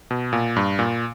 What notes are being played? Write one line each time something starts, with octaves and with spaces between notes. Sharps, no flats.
B2
A#2
G2
A#2